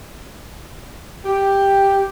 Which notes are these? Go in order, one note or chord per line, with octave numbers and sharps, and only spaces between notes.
G4